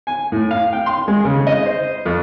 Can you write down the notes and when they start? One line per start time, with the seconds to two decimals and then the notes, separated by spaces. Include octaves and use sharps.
0.07 G#5
0.32 A2
0.51 F5
0.73 G5
0.86 C6
1.08 G#3
1.25 C#3
1.47 D#5
1.66 C5
2.06 F2